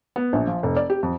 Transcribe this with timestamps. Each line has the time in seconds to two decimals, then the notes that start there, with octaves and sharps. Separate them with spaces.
0.16 B3
0.33 A#1
0.47 F3
0.63 F1
0.77 D5
0.90 G4
1.03 F2